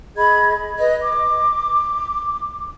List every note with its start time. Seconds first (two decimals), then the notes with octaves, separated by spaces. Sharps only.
0.17 G#4 D#5 B5 G#6
0.78 B4 D#5
1.03 D6